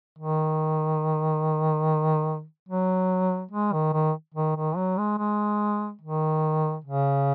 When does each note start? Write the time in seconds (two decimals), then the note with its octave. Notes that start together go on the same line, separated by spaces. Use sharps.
0.19 D#3
2.69 F#3
3.51 G#3
3.73 D#3
3.93 D#3
4.35 D#3
4.57 D#3
4.77 F#3
4.98 G#3
5.19 G#3
6.02 D#3
6.84 C#3